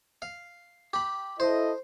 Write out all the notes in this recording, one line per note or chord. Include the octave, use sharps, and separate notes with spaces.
F5
G4 B5
E4 A4 C5 D#5